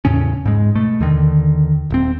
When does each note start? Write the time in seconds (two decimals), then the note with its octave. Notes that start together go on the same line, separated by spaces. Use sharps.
0.05 E2 A2 C#3 C#4
0.45 G#2 G#3
0.75 B2 A3
1.00 D#2 D3 D#3
1.90 D#1 C4